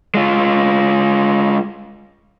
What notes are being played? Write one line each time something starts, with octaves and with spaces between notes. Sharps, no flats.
G#3 F4